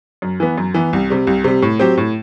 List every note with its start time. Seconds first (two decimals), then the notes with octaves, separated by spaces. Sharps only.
0.22 F#2
0.40 E3 B3
0.58 F#2
0.74 E3 B3
0.93 C2
1.10 C3 G3
1.27 C2
1.44 C3 G3
1.62 A2
1.79 F#3 C4 G4
1.97 A2